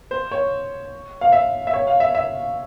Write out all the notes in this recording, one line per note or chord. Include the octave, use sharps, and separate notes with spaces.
C5
C#5
F5
E5
E5
C#5
F5
E5
E5